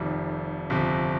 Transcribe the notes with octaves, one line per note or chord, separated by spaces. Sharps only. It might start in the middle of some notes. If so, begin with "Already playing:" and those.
Already playing: F1 F2 C3 D#3 G3
G1 F2 C3 F3